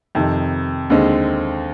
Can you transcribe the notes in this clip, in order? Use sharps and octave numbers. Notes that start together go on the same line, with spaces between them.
F2 C3 D#3
D#2 D3 G#3 C4